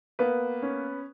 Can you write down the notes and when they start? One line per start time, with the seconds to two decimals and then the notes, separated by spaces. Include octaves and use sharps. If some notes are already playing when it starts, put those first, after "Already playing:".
0.19 A#3 B3 B4
0.62 C#4